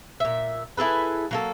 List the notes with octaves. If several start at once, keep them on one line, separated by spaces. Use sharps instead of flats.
A#2 E5
E4 G#4 A4 B4
F#3 A#3 A4